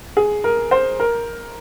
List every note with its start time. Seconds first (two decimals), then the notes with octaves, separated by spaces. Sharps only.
0.17 G#4
0.44 A#4
0.71 C5
1.00 A#4